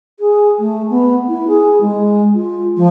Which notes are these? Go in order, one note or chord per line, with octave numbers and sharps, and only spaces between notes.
G#4
A3
B3
E4
G#4
G#3
F4
F3